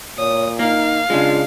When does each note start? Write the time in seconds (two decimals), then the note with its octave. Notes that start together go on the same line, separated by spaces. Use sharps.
0.19 A#2 C#5 D#6
0.59 A#3 D#4 F5
1.10 C#3 G#3 D4 F4